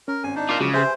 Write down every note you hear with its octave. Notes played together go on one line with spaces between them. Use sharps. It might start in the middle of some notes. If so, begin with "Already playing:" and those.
C#4 A#4
G#1 G#5
D4 D#4
F4 A#4 D6
C#3 F3 F#3 G#3
G4 G#4 B4 C5 E5